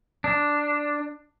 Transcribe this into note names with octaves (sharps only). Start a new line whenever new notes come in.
D4